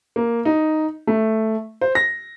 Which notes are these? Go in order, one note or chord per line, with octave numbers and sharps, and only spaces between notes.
A#3
D#4
A3
C5
A#6